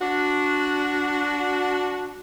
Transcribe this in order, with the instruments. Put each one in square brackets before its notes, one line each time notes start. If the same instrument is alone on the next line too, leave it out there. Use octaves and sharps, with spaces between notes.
[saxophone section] D4 F#4